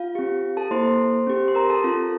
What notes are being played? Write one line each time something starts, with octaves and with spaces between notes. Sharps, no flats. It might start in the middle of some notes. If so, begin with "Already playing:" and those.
Already playing: F4 F5
C4 G4
A4 A5
A#3 E4 A4 C5 C6
C4 G4
C6
A#4 A#5
A4 A5
C4 F4 A4